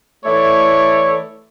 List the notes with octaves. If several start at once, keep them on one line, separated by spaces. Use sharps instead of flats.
E3 A3 E4 A4 C#5 D5